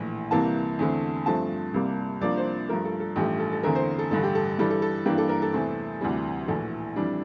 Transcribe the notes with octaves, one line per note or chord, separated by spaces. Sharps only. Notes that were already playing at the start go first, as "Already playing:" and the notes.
Already playing: A#1 A2 E3
C2 C3 E3 A#3 A5
E2 D3 A3 C4
G2 F3 A3 C4 A5
C2 C3 G3 A#3
C2 C3 F3 A#3 D4 D5
C5
G2 F3 A3 A#4
A4
A4
A1 G2 F3 A3 G4
A4
A4
E2 D3 A3 C4 A#4
C5
A4
A1 G2 D3 A4
G4
A4
G2 E3 G3 A4
A4
A4
G2 E3 A#3 D4 G4
A4
A#4
A4
E2 C3 E3 A3 C4
D2 C3 E3 G3
A#1 A2 E3 A4
F2 E3 G3 D4